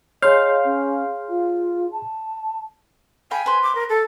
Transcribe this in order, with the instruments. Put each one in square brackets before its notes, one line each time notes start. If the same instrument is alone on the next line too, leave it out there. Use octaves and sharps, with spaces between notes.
[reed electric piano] G#4 C6 G6 [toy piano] C#5 [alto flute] D#5 [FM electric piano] F5
[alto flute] C#4
F4
A5
[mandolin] F5 G5 B5 [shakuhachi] G#5
[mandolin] B4 C5
[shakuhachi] D6
A#4
A4